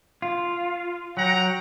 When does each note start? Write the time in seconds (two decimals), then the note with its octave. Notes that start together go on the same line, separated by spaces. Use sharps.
0.22 F4
1.17 F#3 F#5 G5 A#5